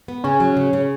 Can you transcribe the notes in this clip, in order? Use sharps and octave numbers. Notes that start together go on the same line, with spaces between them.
B3
C#3 C#4
F#3
C#3
C#3